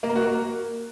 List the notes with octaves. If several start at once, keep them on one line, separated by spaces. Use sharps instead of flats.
A#3
A#4
F#4
A#3